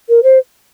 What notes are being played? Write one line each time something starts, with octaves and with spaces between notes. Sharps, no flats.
A#4
C5